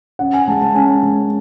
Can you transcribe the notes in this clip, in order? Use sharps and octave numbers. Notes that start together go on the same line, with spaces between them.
C#4 F#5
G#5
G#3 A5
A5
C#4 G#5
G#3